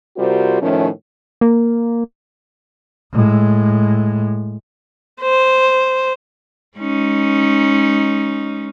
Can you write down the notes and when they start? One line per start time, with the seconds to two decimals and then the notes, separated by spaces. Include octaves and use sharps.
0.17 C3 G3 F4 F#4 A#4 C5
0.61 A2 D#3 F3 A3 C#4
1.41 A#3
3.12 A2 G#3
5.21 C5
6.78 G#3 C#4 D#4